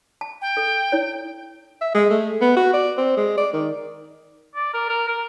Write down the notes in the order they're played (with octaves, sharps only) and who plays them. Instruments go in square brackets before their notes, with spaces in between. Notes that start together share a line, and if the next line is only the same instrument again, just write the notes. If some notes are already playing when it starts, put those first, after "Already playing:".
[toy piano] A5
[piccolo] G5
[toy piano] A4
E4 C#5
[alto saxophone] E5
G#3
A3
B3
F#4
D5
C4
G#3
D5
D#3
[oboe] D5
A#4
A#4
A#4